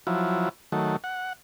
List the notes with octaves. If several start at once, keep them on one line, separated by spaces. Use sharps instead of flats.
F3 F#3 E4
D#3 F#3 A3
F#5